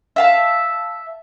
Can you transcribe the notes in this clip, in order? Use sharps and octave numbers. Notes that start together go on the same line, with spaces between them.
E5 F5 A5